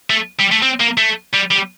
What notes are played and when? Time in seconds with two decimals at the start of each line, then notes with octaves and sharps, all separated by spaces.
0.10 A3
0.39 G3
0.51 A3
0.62 C4
0.80 A#3
0.98 A3
1.33 G3
1.51 G3